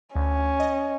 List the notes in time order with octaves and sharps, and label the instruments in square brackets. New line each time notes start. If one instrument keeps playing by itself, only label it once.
[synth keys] D2 [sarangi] C#4
[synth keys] D#5